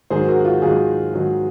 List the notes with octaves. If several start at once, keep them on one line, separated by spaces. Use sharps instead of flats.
G#2 D#3 F#3 G#4 C5
F#4 A#4
F#4
F4
G#2 D#3 F#3 F4 G#4
G#2 D#3 F#3